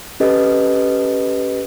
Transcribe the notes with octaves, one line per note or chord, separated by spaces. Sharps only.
C#4 G4 A4 B4 D#5